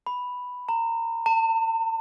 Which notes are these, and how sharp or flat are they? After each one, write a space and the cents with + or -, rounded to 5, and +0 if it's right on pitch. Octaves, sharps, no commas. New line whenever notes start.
B5 +0
A#5 -25
A5 +45